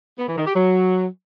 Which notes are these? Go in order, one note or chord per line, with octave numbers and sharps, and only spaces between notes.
B3
E3
D#3
G4
F#3